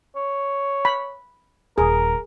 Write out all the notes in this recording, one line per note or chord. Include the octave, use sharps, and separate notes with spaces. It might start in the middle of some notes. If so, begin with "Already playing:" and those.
C#5
B5
D#1 G#4 A#4